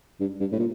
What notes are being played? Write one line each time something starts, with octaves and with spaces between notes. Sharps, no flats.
G2
G2
A2
A#2